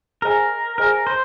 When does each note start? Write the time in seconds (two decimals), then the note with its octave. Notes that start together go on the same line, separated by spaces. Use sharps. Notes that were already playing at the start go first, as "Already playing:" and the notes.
0.22 G#4 A#4 C5 D#5 G#5
0.78 G#4 A#4 C5 D#5 G#5
1.07 C5